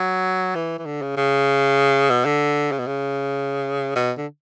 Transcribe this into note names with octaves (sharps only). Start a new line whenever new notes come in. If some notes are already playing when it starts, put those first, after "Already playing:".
Already playing: F#3
E3
E3
D3
C#3
C#3
B2
D3
C#3
B2
C#3
B2
D3